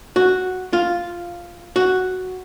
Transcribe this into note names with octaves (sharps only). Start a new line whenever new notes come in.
F#4
F4
F#4